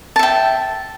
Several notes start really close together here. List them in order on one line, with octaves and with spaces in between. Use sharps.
A5 E5 G5